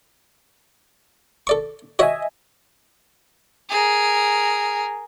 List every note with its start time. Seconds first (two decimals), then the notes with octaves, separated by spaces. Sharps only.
1.47 A4 D5 C#6
1.99 F#4 C#5 D#5 E5 G#5
3.70 G#4 A#4